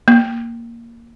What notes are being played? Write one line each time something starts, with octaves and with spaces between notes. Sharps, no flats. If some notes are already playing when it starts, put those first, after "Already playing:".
A#3